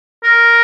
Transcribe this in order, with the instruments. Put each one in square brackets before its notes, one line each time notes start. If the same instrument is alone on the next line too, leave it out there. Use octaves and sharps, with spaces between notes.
[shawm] A#4